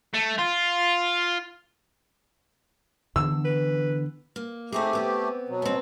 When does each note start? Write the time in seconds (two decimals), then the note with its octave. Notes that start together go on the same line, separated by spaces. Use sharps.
0.14 A3
0.39 F4
3.16 D3 E3 B3 E6
3.45 B4
4.36 A#3
4.72 A3 C4 D#4 G4 G#4
4.93 B3 C4 D5
5.49 B2 F#3
5.62 B3 C4